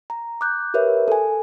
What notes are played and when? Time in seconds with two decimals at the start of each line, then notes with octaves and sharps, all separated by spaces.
0.10 A#5
0.41 D6 F#6 G6
0.74 G4 A#4 B4 C#5 E5
1.08 A4 G#5